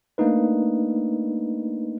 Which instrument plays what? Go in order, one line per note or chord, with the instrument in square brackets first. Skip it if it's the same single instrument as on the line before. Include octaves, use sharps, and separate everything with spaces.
[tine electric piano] A3 A#3 D4 D#4 B4